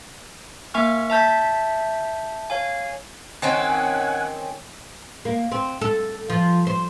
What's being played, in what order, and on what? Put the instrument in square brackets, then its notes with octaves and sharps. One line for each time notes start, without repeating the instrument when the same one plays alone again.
[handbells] A#3 E5 G#5 C#6 F6
E5 A5 G6 B6
C#5 F5 G#5
[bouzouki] D#3 C4 C#4 [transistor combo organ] F#5 G#5
[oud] A#3
C4
A4
F3
C5